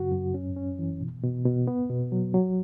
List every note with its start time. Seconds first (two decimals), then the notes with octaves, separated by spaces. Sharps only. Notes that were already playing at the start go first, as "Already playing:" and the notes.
Already playing: F#2 C#3 F#4
0.12 F#2
0.34 C#4
0.56 C#4
0.79 E3
1.01 B2
1.23 B2
1.45 B2
1.67 B3
1.89 B2
2.12 F#3
2.34 F#3